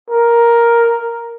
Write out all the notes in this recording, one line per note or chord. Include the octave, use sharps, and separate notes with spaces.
A#4